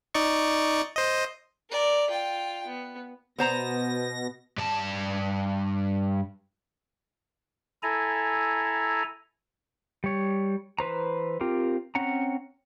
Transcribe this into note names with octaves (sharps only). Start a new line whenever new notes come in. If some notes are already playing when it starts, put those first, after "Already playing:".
D#4 D5 C#6
C5 D#5
A#4 D5
F4 G5
B3
B2 B3 C5 A#5 A#6
G2 A5
E4 A4 G#5 A#5
G3 C#5
E3 B4 C5 A#5
C4 F4 G4 A#4
C4 C#4 F#5 A#5